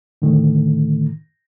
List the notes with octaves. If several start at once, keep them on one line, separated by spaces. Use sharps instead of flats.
A2 D3 D#3 A3